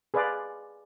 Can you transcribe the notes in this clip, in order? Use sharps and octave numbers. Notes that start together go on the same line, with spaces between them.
G#4 B4 C5 D5 F5